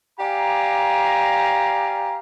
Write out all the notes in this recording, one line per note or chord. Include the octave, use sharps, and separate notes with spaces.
G4 D5 F5 G#5 A#5